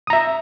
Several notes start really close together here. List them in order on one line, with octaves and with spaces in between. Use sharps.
D#6 A#5 E5